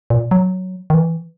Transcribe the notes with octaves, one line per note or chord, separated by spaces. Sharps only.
A#2
F#3
D#3
E3